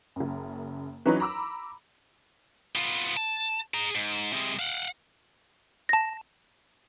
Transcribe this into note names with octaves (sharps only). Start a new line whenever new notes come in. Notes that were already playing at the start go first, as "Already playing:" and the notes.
F#1 F#2
E3 F#3 C#4 D#4 B4 C#5
A#5 B5 D6 E6
B3 F4
A5
G#4 A#5
G#2
C3 G#3
F5 F#5
A5 A#6